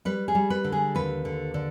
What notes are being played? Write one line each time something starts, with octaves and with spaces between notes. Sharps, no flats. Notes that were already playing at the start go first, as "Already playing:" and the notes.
G3 B4
G#4
G3
B4
D3
G#4
D#2 B4
D3
D3